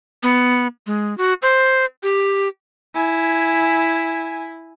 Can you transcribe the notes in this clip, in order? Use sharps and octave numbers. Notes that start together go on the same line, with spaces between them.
B3
G#3
F#4
C5
G4
E4 G#5